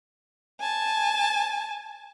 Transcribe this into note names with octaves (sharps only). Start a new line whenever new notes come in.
G#5 A5